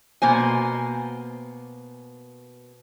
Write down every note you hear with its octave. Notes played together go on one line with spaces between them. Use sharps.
B2 A#3 C5 G#5